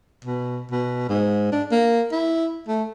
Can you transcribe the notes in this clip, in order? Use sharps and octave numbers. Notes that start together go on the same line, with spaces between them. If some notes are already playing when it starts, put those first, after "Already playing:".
B2
B2
G#2
D4
A#3
E4
A3